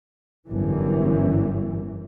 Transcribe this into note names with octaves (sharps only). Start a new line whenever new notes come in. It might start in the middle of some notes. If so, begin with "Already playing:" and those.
G1 F#2 E3